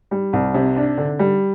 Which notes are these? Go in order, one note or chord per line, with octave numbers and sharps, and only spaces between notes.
G3
C2
C3
D4
D3
G3